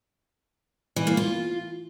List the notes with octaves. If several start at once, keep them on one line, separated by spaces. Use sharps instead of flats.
E3
A#3
F4